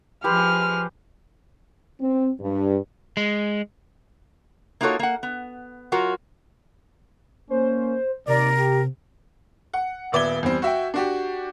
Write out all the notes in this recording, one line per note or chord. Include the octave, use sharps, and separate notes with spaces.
F3 G#3 G4 B4 C5 F6
C4
G2
G#3
A#3 D#4 F4 F#4 A4 C#5
A#3 F#5
B3
F#3 F4 F#4 A#4
A#3 C#4 C5
D#2 C3 A#4 D5
G4
F#5
D#1 B3 D5 E5 G#6 G7
E2 G3 C4
F#4 E5 G5
D4 F#4 G4